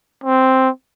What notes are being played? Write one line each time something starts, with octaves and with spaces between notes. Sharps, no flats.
C4